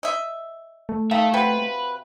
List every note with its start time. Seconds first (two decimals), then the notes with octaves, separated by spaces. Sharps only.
0.03 D#5 E5
0.89 A3
1.11 D#3 A4 E5 F5
1.34 C3 F#4 B4 F#5 G5